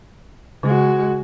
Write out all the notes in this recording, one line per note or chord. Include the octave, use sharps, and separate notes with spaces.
C#3 G#3 F#4